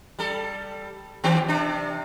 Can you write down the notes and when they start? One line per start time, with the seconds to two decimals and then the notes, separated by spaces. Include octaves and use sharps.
0.19 G3 A4
1.24 D#3 B3 G4
1.48 C3 D4